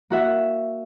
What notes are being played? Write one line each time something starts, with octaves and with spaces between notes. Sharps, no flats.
A#3 F#4 E5 F#5